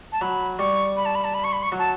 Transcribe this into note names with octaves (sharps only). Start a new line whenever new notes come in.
A5
F#3 B5
G3 C#6
B5
A5
B5
A5
B5
C#6
B5
C#6
F#3
A5